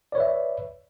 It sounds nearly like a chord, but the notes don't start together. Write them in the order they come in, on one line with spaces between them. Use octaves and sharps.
D5 C#5 B4 E5